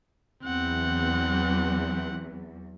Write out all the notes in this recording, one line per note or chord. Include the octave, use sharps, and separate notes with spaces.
E2 F#3 C4 F#5